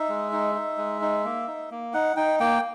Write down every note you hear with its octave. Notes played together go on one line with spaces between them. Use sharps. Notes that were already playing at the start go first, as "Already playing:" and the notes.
Already playing: D#4 E5
G#3
D#4
D#4
G#3
D#4
A#3
D#4
A#3
D#4 F#5
D#4 G5
A#3 G5